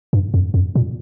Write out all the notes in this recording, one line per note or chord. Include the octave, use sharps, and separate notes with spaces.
G2
F2
F2
A#2